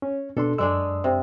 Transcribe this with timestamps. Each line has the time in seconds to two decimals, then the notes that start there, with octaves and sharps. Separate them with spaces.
0.02 C#4
0.37 B2 D4 A4 C6
0.58 F#2 G#3 D4 G#4 E6
1.04 C3